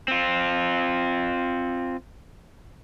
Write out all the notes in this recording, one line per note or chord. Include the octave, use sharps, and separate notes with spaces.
C4 F4